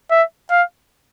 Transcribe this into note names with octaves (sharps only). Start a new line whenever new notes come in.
E5
F5